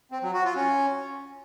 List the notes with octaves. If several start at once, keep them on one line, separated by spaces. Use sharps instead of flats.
C4
F#3
F#4
F4
C#4